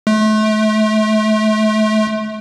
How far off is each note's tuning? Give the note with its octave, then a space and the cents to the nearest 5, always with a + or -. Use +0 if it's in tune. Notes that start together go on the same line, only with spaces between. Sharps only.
A3 -35